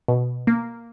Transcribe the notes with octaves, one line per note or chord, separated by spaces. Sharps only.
B2
A#3